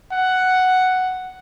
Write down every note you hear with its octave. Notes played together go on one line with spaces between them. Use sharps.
F#5